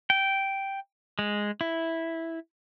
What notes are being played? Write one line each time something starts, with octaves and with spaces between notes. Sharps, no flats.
G5
G#3
E4